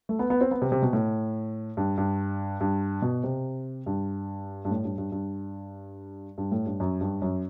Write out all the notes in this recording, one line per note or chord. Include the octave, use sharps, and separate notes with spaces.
A3
B3
B3
C4
B3
C3
C3
B2
A2
G2
G2
G2
B2
C3
G2
G2
A2
G2
G2
G2
G2
A2
G2
F#2
G2
F#2